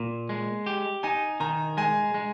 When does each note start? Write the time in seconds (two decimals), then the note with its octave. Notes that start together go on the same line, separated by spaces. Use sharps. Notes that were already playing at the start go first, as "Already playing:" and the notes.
Already playing: A#2
0.29 G#3
0.66 G4
1.03 D#4 G#5
1.40 D#3 A#5
1.77 G#3 G#5
2.14 G#3